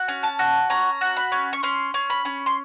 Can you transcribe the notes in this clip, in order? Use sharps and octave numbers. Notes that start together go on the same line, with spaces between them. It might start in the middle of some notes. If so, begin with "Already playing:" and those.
Already playing: F#4
C#4
A5
F#4
C#4 A#5
F#4
B5
C#4
C#6
C#4 C6
C#4
B5
C#4
C6